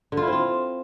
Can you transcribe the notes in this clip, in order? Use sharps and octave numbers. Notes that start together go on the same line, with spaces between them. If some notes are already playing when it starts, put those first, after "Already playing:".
D3
F4
E4
C4
F4